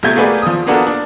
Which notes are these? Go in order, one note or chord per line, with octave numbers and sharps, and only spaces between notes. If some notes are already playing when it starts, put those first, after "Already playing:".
A#1 C3 A3 E5 G6 G#6
A3 A#3 F#4 G#4 B4 D5
F3 D#6
A#3 B3 D4 F#4 A4 A#4
D4